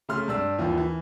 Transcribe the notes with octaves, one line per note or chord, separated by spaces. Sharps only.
C#3 A3 C6 F6
G2 D4 E6
D#2 E3 F3
E3